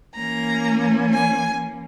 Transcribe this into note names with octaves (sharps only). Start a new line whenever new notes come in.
E3 A#3 C#4 A#5
G#5